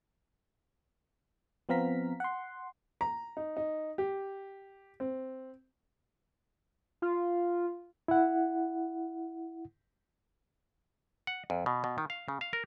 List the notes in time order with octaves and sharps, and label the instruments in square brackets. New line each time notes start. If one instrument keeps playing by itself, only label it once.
[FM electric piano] F3 B3 C4 F5 A#5 B6
F#5 C6
[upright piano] A#5
D#4
D#4
G4
C4
[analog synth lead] F4
[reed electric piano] E4 F#5
[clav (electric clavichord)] F#5
F2
B2
B2
D#3
F5
C#3
F5
A#4